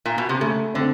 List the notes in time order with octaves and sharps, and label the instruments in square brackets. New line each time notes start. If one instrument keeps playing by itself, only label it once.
[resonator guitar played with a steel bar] A#2
B2
C3
[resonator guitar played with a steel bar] C#3 [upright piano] A3
[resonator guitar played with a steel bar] D3 [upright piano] C4